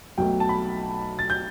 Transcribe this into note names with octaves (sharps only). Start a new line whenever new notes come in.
B1 B2 A3 G5
A5
B5
A6
G6